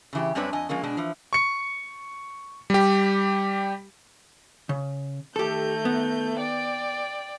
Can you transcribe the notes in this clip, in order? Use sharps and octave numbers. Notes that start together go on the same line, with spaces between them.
C#3 E3 G4
F#2 G3 C4 D4 B4 C#5
F2 D#5 G#5
F3 G#3 A#3 C#4
B2 G#3 D4
E3 F3
C#6 C#7
G3 G4
C#3
D#3 A3 G4 A4 G6
B3
D5 G5